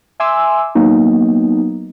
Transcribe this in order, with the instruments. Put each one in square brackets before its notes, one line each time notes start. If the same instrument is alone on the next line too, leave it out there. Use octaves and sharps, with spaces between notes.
[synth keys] E5 G#5 C6 D6 E6
F#3 A#3 B3 D#4